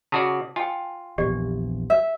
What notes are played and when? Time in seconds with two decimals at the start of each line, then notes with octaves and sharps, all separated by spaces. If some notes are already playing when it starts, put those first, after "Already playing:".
0.12 C#3 F#4 D5 A5
0.56 F4 G5 G#5
1.18 A#1 E2 G4 D5
1.90 E5